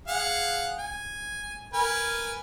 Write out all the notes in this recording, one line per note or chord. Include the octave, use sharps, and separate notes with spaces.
G#4 F5 F#5
G#5
A#4 B4 G#5